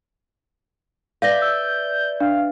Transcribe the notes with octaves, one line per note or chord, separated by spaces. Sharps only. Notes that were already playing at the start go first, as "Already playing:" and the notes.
B4 D5 E5 F5 G6 A#6
E6
D4 F5